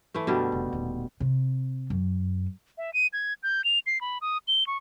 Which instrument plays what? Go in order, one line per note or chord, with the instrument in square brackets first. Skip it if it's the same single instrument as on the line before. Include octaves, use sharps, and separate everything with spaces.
[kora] E3 A3
[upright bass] F#2 [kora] B2 D3 G3
[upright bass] F1
D#1
C3
F#2
[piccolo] E5
D#7
G#6
G6
F7
C7
B5
D#6
G7
C#6